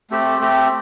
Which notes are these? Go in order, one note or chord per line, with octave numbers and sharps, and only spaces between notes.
A3 C4 G4
A3 C4 G4